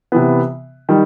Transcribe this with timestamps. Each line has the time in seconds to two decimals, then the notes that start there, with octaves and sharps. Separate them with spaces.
0.12 C3 E3 B3
0.89 D#3 G3